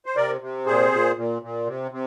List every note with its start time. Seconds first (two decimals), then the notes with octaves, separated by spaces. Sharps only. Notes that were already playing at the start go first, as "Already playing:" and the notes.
0.06 C5
0.16 C3 A#4 D5
0.41 C3
0.66 A#2 G#4 C5
0.92 A#2
1.17 A#2
1.42 A#2
1.66 C3
1.91 C3